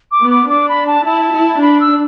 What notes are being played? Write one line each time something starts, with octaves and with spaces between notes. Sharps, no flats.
D6
B3
D6
D4 D6
B5
A5
E4 A5
E4
D4 B5
E6